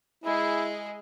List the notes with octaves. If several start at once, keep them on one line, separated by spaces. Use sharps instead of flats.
G#3 E4 G#4